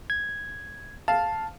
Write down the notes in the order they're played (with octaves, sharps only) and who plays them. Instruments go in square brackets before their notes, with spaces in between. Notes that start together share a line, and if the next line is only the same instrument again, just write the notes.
[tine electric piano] G#6
[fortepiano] F5 [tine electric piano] A5